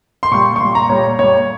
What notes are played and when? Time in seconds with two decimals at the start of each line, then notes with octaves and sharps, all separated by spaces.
0.23 C6
0.31 A#2 G3 C#6
0.56 C#6
0.60 A#2 G3 C6
0.75 A#5
0.89 A#2 G3 C#5
1.19 A#2 G3 C#5